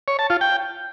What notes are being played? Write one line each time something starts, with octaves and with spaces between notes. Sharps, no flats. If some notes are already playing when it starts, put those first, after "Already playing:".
C#5
A5
F4
G5